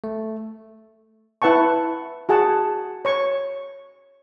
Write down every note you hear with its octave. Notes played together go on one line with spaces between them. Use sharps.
A3
E4 B4 F#5 A5 C#6
F#4 G#4 F#5 A5
C#5 C#6